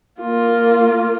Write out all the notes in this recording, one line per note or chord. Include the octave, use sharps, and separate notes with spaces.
A#3 F4